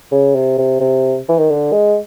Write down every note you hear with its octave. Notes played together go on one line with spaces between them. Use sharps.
C#3
C3
C3
C3
E3
D#3
D3
G#3